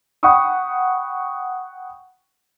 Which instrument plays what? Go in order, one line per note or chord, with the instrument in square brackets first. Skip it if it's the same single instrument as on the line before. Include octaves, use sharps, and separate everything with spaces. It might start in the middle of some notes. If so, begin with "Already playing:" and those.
[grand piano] F#5 G5 B5 C#6 D#6